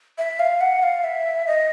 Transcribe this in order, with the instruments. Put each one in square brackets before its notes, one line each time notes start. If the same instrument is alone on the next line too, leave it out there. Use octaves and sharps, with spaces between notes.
[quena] E5
F5
F#5
F5
E5
D#5